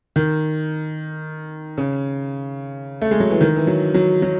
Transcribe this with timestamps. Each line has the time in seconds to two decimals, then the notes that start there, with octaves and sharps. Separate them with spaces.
0.16 D#3
1.78 C#3
3.01 A3
3.11 G#3
3.20 F#3
3.31 E3
3.41 D#3
3.56 E3
3.67 F#3
3.94 F#3
4.22 F#3